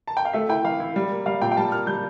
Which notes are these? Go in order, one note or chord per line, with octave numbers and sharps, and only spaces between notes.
A5
G5
F5
A3 E5
E4 G5
E3 F5
E4
G3
A#3
G3 F5
A#2 G5
G5
G3 A5
A#3 F6
G3 G6